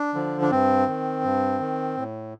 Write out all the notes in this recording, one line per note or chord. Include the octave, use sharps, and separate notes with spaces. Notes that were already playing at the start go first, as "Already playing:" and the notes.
Already playing: D4
D3 F3
D4
G2 C4
D#3
G2
D#3
A2